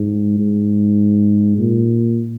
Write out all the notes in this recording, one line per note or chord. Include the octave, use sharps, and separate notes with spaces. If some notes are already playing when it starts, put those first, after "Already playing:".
Already playing: G#2
G#2
A#2